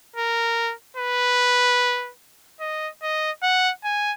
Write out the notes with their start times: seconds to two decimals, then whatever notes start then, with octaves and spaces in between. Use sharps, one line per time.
0.16 A#4
0.97 B4
2.60 D#5
3.02 D#5
3.43 F#5
3.84 G#5